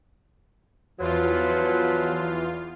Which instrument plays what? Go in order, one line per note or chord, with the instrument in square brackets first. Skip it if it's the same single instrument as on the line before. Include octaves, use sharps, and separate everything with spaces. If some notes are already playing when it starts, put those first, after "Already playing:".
[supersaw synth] E2 F4 [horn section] F3 F#3 B4